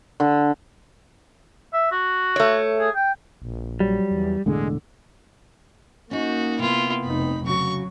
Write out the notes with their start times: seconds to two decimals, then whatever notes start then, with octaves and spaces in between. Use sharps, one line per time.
0.20 D3
1.73 E5
1.92 F#4
2.36 A3 C#5
2.79 G#4
2.95 G5
3.42 A#1
3.80 F#3 G3
4.11 E2
4.46 E1 A2 D3 G#3
6.11 A#3 C#4 D#4 F#4
6.59 C3 B3 E4 F4
7.05 F1 D#4 B5
7.46 C#3 F#3 F#4 C#6